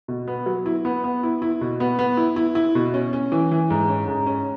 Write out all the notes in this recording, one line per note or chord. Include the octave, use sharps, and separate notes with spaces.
B2
B3
F#3
E4
B3
B3
E4
E4
B2
B3
B3
E4
E4
E4
B2
C#4
C#4
E3
E3
G#2
C#4
G#2
C#4